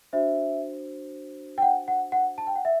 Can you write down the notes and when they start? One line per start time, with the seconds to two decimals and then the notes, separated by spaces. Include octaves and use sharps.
0.13 D4 F#4 C5 E5
1.58 G5
1.62 F#5
1.88 F#5
2.12 F#5
2.38 A5
2.47 G5
2.56 F#5
2.65 E5